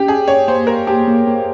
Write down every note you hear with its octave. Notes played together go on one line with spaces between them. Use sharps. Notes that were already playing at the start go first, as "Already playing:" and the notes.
Already playing: C#4 G4
G#4
C#5
A#3 C5
A#4
G4
A#3
A#3